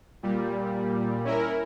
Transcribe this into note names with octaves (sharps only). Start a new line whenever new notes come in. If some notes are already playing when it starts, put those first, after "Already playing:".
A#2 G3
C#4 E4 A#4